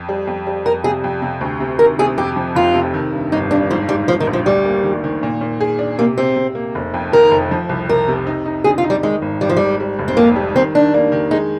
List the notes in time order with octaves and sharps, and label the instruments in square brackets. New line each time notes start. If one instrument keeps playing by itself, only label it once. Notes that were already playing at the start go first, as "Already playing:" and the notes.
Already playing: [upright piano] F2
G3
F2
G3
[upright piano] F2 [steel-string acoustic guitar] A#4
[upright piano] C3 [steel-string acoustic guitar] G#4
[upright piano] F2
C3
D2
C3
[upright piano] D#3 [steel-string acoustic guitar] A#4
[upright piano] C3 [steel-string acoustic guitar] G#4
[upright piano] F2 [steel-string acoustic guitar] G4
[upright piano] F3
[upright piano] F1 [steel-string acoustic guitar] F4
[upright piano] C3
D#3
G2
[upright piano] G1 [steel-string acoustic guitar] D#4
[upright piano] G2 [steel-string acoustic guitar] D4
[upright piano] G#2 [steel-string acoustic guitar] F3
[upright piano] G#2 [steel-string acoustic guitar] G3
[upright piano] G#2 [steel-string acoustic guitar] F3
[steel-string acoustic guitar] D#3
[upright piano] A#1
[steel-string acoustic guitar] F3
[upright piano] D2 [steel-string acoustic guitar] G3
[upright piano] A#3
D#3
D#3
A#2
A#2
G#4
D4
[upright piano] C3 [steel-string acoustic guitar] A#3
[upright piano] C3 [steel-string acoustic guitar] C4
[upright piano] C3
A#3
F1
F2
[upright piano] D#3 [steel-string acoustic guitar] A#4
[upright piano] F1
F3
C2
[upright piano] C2 [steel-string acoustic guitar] A#4
[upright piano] C3
D#4
D#4
[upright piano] D3 [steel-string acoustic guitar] G#4
[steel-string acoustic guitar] F4
[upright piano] D#4
[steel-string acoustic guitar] G3
[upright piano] D#3 [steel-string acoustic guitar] G#3
[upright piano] G#1
[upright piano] G#1 [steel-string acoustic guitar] G3
[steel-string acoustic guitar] F3
[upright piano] G#1 [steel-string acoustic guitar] G3
[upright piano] G3
F1
[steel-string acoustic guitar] C4
[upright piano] F2 [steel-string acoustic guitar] A#3
[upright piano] G3
[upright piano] D#3 [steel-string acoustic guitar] C4
[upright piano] D#3 [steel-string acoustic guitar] D4
[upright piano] A#3
D#3
[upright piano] G#3 [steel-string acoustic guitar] D#4